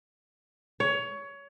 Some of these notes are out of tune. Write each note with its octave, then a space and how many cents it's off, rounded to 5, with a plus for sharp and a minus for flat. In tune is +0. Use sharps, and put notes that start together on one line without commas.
C#5 +20